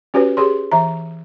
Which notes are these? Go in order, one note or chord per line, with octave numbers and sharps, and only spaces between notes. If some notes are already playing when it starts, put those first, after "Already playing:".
C#4 F#4 G4 B4 C#5
G4 G#4 C#5 C6
E3 E5 A#5